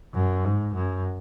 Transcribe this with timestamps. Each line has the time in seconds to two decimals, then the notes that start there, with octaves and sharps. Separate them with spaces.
0.14 F#2
0.44 G#2
0.75 F#2